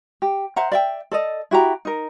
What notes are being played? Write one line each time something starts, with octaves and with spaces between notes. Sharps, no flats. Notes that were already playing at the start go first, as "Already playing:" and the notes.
G4
C5 E5 F#5 A#5
D5 E5 G5
A4 D5 D#5
E4 F#4 G4 A#5
D#4 A#4